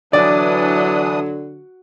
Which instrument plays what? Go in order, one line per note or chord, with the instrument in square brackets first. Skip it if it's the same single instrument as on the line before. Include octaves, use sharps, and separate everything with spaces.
[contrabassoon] D3 [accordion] E3 D4 D#6 [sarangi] F#3 [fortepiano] D5